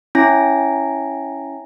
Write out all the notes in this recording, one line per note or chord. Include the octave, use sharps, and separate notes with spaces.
C#4 E4 G#5 A#6